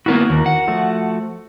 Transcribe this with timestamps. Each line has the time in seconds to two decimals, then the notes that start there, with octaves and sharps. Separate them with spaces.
0.06 A#3 B3 E4 F#4 A#4
0.30 D#2
0.46 F#5
0.68 F3 A3 F#4